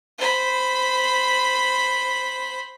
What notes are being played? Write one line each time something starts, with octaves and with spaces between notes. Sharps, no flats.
C5 B5